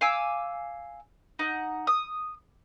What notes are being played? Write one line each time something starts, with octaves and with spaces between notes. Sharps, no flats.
F5 G#5 D6 E6
D#4 F#5
D#6